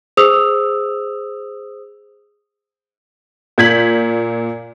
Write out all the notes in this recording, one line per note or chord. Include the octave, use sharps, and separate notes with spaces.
G#4 C5 D#6 E6 F7
A#2 G6 G#6 B6 F#7